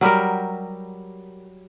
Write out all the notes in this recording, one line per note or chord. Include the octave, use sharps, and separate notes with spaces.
F#3 G3 G4 A#4